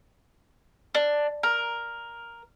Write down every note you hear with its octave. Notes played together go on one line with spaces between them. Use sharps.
D4
A#4